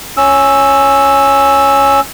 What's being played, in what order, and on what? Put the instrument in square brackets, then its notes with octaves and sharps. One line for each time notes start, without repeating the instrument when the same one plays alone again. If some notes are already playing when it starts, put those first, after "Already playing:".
[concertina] C#4 E6